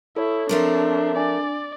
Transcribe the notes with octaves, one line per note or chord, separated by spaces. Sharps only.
E4 A4 C#5
F3 A3 C4 D4 A#4
D4 D5 G#5